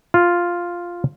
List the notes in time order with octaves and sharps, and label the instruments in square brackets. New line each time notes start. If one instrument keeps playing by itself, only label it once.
[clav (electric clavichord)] F4